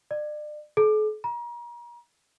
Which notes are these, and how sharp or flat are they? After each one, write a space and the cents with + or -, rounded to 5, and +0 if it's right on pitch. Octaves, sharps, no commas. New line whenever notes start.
D5 +35
A4 -45
A#5 +35